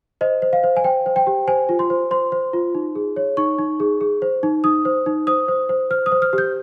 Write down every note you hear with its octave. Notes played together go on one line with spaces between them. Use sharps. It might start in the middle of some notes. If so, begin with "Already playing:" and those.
C5 D#5
C5
F5
C5
G#5
C5 G5
C5
G5
G4
C5 G#5
F4
C6
C5
C5 C6
C5
F4
D#4
G#4
C#5
D#4 C#6
D#4
G#4
G#4
C5
D#4
D#4 D#6
C5
D#4
C5 D#6
C5
C5
C5 F6
D#6
C5
F6
G4
G6